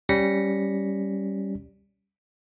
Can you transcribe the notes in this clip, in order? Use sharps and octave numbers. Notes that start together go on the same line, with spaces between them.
G3 C#4 A#6 B6 C#7